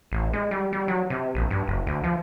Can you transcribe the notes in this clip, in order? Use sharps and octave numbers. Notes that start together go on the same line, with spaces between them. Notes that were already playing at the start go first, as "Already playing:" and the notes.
A1
G#3
G3
G3
F#3
C3
A#1
G2
F#1
D2
F3